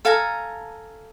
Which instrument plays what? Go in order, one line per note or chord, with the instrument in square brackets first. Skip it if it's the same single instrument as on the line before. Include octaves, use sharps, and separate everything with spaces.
[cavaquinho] A4 F5 G#5 A#5